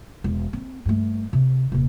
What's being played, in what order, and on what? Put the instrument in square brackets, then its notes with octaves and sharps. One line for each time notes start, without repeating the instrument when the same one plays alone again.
[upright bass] E1
C4
G2 A3
C3
D#1 C3